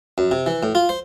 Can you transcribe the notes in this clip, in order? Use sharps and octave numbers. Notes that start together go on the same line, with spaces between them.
F#2
C3
E3
A2
F4
C5